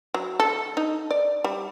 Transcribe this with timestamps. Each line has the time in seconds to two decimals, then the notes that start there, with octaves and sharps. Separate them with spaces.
0.14 F#3
0.40 A4
0.77 D#4
1.11 D5
1.44 G3